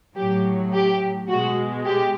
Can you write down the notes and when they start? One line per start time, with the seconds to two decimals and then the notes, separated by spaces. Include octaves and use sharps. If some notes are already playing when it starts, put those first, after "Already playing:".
0.16 A2 F#3 G4
0.73 G4
1.28 B2 G#3 F#4
1.85 G4